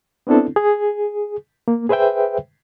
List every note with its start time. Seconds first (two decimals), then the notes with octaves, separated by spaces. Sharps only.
0.27 B3 C4 D4 E4 A4
0.56 G#4
1.68 A#3
1.89 G#4 B4 C5 E5 G5